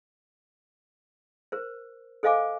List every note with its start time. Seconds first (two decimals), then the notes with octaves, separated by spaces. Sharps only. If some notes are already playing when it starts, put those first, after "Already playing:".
1.52 A#4 C5
2.23 A4 C5 D#5 F5 G#5 D6